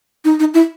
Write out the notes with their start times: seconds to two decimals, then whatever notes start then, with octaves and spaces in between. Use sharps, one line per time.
0.25 D#4
0.40 D#4
0.54 E4